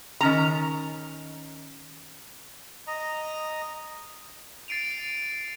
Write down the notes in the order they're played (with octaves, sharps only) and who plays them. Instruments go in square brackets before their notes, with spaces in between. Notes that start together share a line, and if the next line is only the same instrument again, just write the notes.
[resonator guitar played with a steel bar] D#3 C#4 A#5
[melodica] D#5 A#5
[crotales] A6 C7 D7 D#7 F7